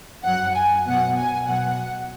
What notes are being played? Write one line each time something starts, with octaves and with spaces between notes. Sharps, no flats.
F#2 F#3 F#5
G#5
B2 F#3 F#5
G#5
B2 F#3 F#5